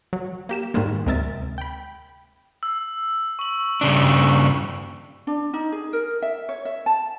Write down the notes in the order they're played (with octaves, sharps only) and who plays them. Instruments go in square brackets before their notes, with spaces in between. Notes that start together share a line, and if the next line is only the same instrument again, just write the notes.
[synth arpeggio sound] F#3
A#3 G4 E7
G#2 D#3 G3 G#3 A#3
D2 C3 G#3 A#4 E5 A6
G5 B5
[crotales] E6
C#6 F#7
[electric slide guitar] G2 C#3 D4
[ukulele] D4
D#4
G#4
A#4
E5
C#5
E5
A5